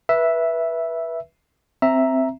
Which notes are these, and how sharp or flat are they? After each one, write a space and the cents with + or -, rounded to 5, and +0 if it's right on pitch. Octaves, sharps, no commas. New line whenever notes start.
B4 -20 E5 +0
C4 +0 E5 +0 A#5 +0